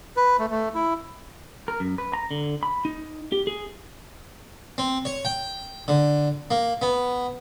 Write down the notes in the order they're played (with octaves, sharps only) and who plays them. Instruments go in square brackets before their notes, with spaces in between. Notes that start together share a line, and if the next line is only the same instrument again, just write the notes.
[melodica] B4
A3
A3
E4
[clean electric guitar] A#4
F#2
B4
A#5
D3
B5
D#4
G4
G#4
[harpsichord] C4
C#5
G5
D3
A#3
B3